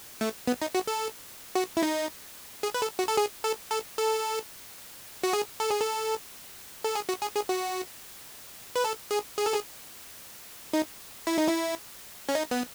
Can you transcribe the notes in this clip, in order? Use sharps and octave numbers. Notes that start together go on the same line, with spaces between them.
A3
B3
D#4
F#4
A4
F#4
E4
D#4
G#4
B4
A4
F#4
A4
G#4
A4
A4
A4
F#4
G#4
A4
G#4
A4
A4
G#4
F#4
G#4
G#4
F#4
B4
A4
G#4
G#4
A4
G#4
D#4
E4
D#4
E4
C#4
D#4
B3